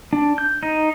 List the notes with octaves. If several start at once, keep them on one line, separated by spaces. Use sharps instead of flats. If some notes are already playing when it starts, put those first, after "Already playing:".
D4
G6
D#4